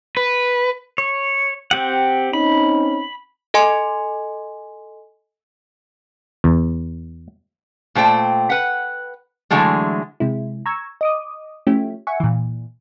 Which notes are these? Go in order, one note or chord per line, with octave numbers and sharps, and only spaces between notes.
B4
C#5
C4 G4 F#5
C4 C#4 D#4 B5
A4 D#5 G#5 C6
E2
A#2 A3 C5 G5
B4 F#5
D3 E3 F#3 G#3 A3
C3 G#3 E4
A#5 C#6 E6 G#6
D#5 D6 D#6
F3 A3 C#4 E4 G4
E5 F#5 G#5 C#6
A#2 E3